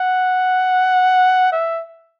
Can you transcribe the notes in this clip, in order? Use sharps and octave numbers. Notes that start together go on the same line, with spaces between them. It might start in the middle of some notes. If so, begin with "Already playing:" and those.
Already playing: F#5
E5